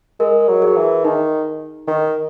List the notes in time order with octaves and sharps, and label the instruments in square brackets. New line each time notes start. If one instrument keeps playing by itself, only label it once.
[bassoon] G#3 [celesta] A#4
[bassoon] F#3
[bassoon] F#3 [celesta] G#4
[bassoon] E3
[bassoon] D#3 [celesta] D#4
[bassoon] D#3